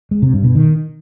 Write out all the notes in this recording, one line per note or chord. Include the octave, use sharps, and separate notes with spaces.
G#3
C3
G2
B2
D#3